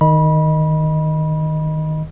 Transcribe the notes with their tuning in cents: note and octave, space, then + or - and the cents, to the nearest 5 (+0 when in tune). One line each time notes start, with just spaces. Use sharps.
D#3 +0 D#5 -5 B5 -25